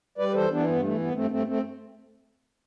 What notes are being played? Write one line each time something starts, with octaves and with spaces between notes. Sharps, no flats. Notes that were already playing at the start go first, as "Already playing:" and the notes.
G3 B4 D5
B4
E3 A4 C5
E3 B3 D4
G2 B3
E3 A3
G2 B3
G2 A3 C4
G2 A3 C4
A3 C4